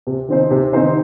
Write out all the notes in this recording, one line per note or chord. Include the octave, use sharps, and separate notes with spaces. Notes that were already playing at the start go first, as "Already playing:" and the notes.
C3
D#3 C4 D#4 C5
C3
D#3 C4 D#4 C5